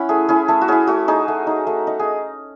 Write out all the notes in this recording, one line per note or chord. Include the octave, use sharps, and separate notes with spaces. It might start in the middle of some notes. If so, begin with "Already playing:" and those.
Already playing: C#4 E4 C#5 F#5
A3 G#4
C#4 E4 G#4
A3 A4
F#4
C#4 E4 G#4
A3 F#4
D#4 G#4
A3
D#4
A3
D#4
G#4